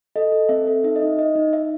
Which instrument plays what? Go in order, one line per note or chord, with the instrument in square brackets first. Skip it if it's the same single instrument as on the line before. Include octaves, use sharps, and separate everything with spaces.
[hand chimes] A4 D#5
A4
C4 E5
A4
D#4 E5
D#5
D#4
D#4 D#5
D#4
D#4 E5